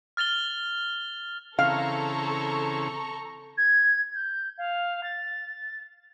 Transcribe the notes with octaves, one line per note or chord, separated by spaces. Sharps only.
F6 A6 F7 G7
C#3 E3 C4 A4 F5 A#5 C#6
G#6
G6
F5
A6